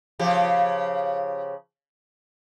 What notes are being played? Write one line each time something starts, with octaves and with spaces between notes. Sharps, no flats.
C#3 F3 G4